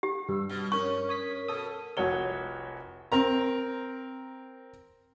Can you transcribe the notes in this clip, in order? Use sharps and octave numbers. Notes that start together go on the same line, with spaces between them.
G4
G2 E6
B2 F6
C#4 A#4 C#6
C#5 D#6 B6
B2 A4 D#6
F1 C2 F#4 C#5 G7
C4 A#4 A#5